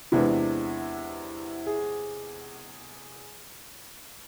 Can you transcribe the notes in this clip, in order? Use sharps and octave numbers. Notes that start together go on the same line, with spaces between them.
E2 C3 G#3 B3 D4 E4
G#4